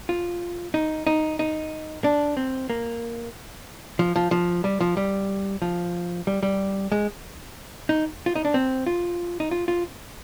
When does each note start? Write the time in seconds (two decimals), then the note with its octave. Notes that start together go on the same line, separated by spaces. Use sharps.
0.09 F4
0.74 D#4
1.07 D#4
1.39 D#4
2.04 D4
2.37 C4
2.70 A#3
3.99 F3
4.16 F3
4.31 F3
4.64 G3
4.81 F3
4.97 G3
5.62 F3
6.27 G3
6.43 G3
6.92 G#3
7.89 D#4
8.26 F4
8.35 D#4
8.45 D4
8.54 C4
8.87 F4
9.40 D#4
9.51 F4
9.68 F4